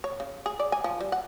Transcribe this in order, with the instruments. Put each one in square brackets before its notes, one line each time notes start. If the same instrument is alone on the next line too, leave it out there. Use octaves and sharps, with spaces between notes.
[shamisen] C#5
C#3
G#4
D5
G#5
F3
G3
F#5